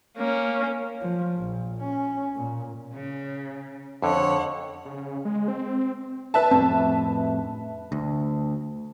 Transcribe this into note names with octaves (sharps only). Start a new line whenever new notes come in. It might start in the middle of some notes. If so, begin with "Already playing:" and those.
A#3 C#4
F3
A#1
C#4
A#2
C#3
F2 D3 C#5 F#5
C#3
G#3
C4
B4 E5 A5
F2 A2 C4
D2